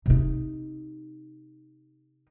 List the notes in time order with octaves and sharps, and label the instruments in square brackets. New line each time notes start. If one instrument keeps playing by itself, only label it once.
[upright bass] C3 D#4